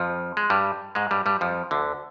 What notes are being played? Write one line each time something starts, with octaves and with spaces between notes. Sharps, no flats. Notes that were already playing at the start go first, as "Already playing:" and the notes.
Already playing: F2 F3
G#3
G2 G3
G#2 G#3
G2 G3
G2 G3
F2 F3
D2 D3